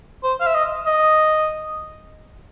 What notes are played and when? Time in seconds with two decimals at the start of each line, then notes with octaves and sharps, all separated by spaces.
0.23 C5
0.40 F5
0.47 E5
0.55 D#5
0.86 D#5